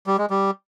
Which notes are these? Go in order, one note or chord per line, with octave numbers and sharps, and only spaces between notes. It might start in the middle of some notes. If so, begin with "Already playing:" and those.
G3
G#3
G3